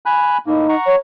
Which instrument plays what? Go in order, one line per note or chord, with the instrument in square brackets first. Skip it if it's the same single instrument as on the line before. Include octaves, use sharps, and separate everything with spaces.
[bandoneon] G#5 B5 F#6
[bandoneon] A2 A#3 [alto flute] D#4
[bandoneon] F#5 A#5 C#6
[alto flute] C#5